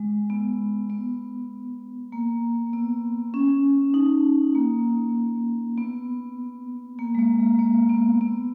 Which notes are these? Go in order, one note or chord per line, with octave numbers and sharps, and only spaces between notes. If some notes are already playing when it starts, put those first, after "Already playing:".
Already playing: G#3
B3
B3
A#3
B3
C#4
D#4
A#3
B3
A#3
G#3
A#3
G#3
A#3
B3
B3